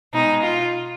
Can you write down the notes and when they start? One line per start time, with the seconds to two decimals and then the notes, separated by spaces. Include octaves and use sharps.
0.13 B2 G#3 D#4
0.43 F4